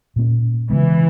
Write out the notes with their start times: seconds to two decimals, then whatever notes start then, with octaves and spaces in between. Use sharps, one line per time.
0.16 A#2 A#3 C#4
0.70 C#3 E3 G#3 B3